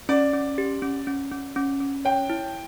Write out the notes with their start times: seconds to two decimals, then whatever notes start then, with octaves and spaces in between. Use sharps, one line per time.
0.09 C#4 D5
0.33 C#4
0.58 G4
0.82 C#4
1.07 C#4
1.31 C#4
1.56 C#4
1.80 C#4
2.05 C#5 G5
2.30 E4